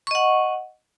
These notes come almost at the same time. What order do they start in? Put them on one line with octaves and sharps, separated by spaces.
C#6 D#5 F#5